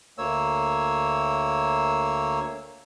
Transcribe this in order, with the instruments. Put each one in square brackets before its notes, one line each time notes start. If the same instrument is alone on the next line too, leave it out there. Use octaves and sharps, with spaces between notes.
[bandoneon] D2 A#3 C#5 E6